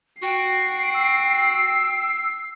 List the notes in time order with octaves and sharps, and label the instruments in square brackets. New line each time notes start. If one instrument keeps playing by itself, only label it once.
[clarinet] F#4 [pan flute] G5 [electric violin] C7
[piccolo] E6